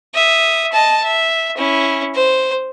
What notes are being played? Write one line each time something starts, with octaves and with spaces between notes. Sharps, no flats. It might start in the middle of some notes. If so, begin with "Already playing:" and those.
E5 D#6
D#5 A5
E5
C#4 E4
C5